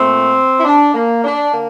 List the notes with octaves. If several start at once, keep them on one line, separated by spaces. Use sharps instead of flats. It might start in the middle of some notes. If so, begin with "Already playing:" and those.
Already playing: A#2 A3 C4
E4
D4
A#3
D4
D3 A#3